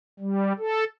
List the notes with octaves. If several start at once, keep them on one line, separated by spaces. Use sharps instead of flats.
G3
A4